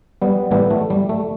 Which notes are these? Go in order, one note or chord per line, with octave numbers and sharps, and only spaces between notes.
G3 B3
A2 E3 G3 B3
A3
G3
A3